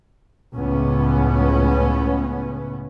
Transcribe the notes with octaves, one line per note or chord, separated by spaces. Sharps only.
C#2 A2 B3 C#4